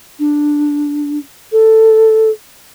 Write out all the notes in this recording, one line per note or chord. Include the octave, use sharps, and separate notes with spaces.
D4
A4